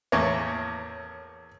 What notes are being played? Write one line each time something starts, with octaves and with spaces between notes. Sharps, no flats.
E2 A2 A#3 C#5